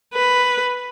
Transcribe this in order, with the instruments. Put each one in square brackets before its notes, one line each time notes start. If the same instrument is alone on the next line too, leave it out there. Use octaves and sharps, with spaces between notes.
[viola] B4